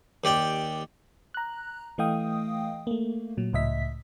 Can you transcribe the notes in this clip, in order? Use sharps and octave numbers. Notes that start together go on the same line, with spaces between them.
D#2 G4 D5 G5
A#5 F#6
E3 A3 D#5 F5 G5 D#6
A3 A#3
A#2 F#3
C#2 A2 D#5 E5 B6